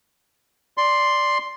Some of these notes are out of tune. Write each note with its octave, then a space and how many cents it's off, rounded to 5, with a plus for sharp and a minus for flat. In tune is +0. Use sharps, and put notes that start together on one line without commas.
D5 +0 C6 +0